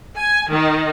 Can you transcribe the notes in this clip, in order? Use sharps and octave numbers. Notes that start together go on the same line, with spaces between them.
G#5
D#3